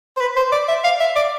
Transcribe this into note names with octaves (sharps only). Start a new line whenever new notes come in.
C5
B4
C5
D5
E5
F5
E5
D5